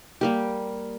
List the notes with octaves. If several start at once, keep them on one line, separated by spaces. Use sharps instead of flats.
G3 A#3 G4